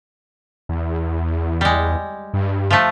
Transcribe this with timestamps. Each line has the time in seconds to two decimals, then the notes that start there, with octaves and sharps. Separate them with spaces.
0.69 E2
1.61 G3 G#3
2.34 G2
2.70 F3 A3